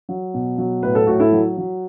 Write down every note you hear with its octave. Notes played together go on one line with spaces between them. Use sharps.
F#3
B2
F#3
A2 B4
A4
A2 F#4
E4 A4
F#3
F#3